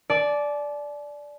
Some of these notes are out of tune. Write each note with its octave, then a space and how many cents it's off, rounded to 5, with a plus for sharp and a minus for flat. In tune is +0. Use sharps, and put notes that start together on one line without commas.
D5 -5 A5 -45